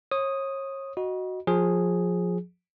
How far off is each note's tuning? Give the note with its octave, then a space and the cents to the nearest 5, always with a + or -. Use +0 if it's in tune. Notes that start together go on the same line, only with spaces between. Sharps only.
C#5 -35 D#6 +0
F#4 +0 D#5 +0 B5 -40
F3 +25 G#4 +0